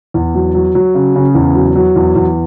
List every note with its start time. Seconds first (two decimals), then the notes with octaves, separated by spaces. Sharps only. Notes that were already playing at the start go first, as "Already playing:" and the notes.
0.14 E2
0.35 F#3
0.55 F#3
0.75 F#3
0.95 C#3
1.16 C#3
1.35 E2
1.55 F#3
1.76 F#3
1.96 E2
2.16 E2